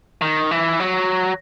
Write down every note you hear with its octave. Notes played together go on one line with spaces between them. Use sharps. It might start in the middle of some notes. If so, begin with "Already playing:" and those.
D#3
E3
F#3